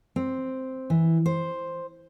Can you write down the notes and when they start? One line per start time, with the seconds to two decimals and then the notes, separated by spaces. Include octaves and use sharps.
0.16 C4
0.90 E3
1.26 C5